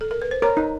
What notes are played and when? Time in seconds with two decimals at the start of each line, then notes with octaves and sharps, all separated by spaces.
0.01 A4
0.11 A#4
0.22 B4
0.31 C5
0.42 A#4 C#5
0.57 D#4